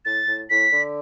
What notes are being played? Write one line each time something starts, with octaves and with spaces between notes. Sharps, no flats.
A2 A6
A2
A2 B6
D3